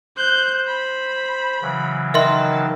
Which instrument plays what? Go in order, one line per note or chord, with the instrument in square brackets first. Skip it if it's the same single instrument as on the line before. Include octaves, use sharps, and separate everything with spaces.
[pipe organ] C5 [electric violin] F#6 G6
[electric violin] B5
[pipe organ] C#3 E3 F#3
[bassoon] D#3 [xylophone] D#5 E5 C6 [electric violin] A5